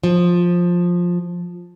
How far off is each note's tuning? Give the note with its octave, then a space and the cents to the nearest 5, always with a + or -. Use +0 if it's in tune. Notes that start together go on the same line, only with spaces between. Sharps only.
F3 +10